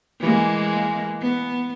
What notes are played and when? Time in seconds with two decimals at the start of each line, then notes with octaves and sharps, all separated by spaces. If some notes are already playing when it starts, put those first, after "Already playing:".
0.20 E3 G#3 A#3
1.21 B3